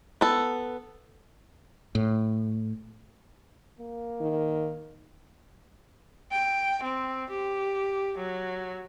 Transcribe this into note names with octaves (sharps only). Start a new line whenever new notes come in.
B3 A4
A2
A#3
D#3
G5
C4
G4
F#3